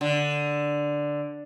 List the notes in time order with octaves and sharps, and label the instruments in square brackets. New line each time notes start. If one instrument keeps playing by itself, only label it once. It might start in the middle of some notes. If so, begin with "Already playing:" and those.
[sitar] D3